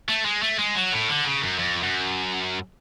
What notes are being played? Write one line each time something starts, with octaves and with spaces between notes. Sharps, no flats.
A3
G#3
A3
G#3
F#3
A2
D3
C#3
F#2
F2
F#2